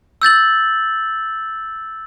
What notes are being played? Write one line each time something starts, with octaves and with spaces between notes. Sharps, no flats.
E6 G6 A6 F#7